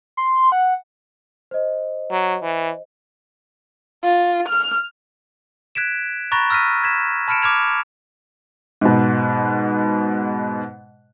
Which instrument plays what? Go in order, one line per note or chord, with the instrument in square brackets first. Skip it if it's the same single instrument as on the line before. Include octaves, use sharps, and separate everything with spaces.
[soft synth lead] C6
F#5
[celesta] C5 D#5
[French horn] F#3
E3
[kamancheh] F4
F6
[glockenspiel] F#6 G#6 B6 D7 E7
A#5 B5 C#6 F#6 A6 A#6
E6 F6 A#6 B6 D#7
G#6 B6 E7
A5 B5 F6 C#7 D7 E7
D6 F6 G#6 F7
[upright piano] G#2 B2